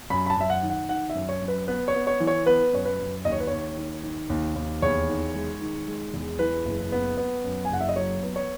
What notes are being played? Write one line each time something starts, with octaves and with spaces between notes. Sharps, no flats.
F#2 B5
B5
A5
F#2 E5
F#5
D#3
F#5
D#3 F#5
E5
F#2
C#5
F#2
B4
B3 B4
C#5
B3
C#5
E3
C#5
B3 B4
F#2 C#5
B4
F#2
D#2 D#5
C#5
B4
D#2 C#5
D#3
D#3
D#2
D#2
E2 C#5
D#3
G#3
D#3
G#3
E2
E3 B4
F#1
B3
B3
F#2
G#5
F#1 F#5
E5
D#5
F#3 C#5
B3
C#5